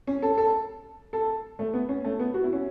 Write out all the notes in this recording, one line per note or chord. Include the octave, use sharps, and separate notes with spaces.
C#4
A4
A4
A4
A3
B3
C#4
A3
B3
F#4
E4
C#4